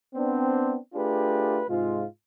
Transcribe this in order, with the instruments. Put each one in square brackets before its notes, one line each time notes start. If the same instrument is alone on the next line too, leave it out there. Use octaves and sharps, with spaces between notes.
[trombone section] B3 C4 D4
A3 D4 F4 G4 G#4 B4
G#2 C3 G#3 F4